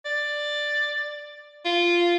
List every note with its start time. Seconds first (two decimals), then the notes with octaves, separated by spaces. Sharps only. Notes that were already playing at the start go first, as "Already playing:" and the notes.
0.05 D5
1.65 F4